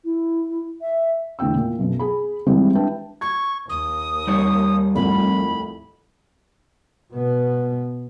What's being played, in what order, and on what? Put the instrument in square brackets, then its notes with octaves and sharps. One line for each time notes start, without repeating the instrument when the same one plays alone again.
[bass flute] E4
E5
[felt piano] E2 A2 D3 G5 E6
A#2
B1 F#2 B2
G#4 B5
D#3 E3 G3 G#3 C4 E4
D4 B4 E5 G5 A5
[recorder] C#6 [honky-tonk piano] G#6
[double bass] D#2 [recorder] D#6
[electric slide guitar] G3 D#4 C#5
[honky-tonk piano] C2 F2 A2 [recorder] B5
[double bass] B2 B3